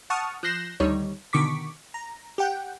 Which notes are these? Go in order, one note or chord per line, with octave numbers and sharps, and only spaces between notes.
F#5 A5 C#6 D#6 F6
F3 F#6 G6 A#6 C7 E7
D2 D3 D#3 G3 D#4 C#5
B2 D3 D#3 C#6 D6 B6
A#5
G4 F#5 G5